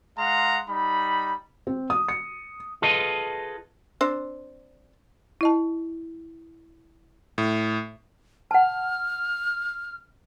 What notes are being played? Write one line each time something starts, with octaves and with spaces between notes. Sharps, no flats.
G#3 F5 F#5 A#5 C6
G3 D#4 B5
C4
D#6
C#7
F4 G#4 A4 B4 D#5
C4 D4 C5
E4 D#5 A5
A2
F#5 A5 F6